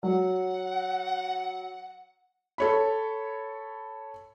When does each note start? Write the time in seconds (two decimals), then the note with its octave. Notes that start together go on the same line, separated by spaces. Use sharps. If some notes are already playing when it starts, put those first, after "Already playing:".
0.03 F#3 F#5
2.58 A4 C#5 B5